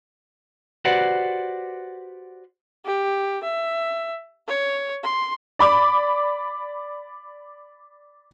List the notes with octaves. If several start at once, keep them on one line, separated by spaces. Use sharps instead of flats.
F#4 G4 B4 C5 D5 F#5
G4
E5
C#5
C6
D5 B5 D6